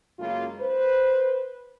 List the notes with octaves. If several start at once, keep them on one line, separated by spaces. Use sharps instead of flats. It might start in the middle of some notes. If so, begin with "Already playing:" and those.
F#2 C#3 G#3 A#3 F4
B4 C5